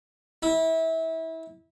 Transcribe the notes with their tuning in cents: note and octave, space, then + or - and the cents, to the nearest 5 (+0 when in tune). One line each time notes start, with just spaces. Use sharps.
E4 -25